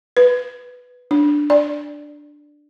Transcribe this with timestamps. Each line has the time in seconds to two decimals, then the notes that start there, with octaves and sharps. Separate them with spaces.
0.17 B4
1.11 D4
1.50 D5